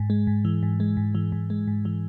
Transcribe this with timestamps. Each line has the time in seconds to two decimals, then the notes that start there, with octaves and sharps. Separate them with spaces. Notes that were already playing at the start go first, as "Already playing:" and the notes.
Already playing: G#2
0.10 G#3
0.27 G#2
0.45 E3
0.63 G#2
0.80 G#3
0.97 G#2
1.15 E3
1.32 G#2
1.50 G#3
1.67 G#2
1.85 E3